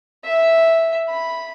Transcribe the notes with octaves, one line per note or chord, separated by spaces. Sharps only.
E5
B5